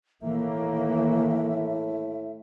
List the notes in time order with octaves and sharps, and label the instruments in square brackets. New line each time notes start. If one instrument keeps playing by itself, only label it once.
[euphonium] A2 [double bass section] D#3 E3 A#3 [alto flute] E5